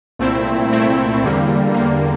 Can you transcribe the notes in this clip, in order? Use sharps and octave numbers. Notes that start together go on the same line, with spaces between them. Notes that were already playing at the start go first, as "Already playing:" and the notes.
C2 A#2 A3 C4 E4
C2 A#2 A3 C4 E4
E2 D3 G3 A#3
E2 D3 G3 A#3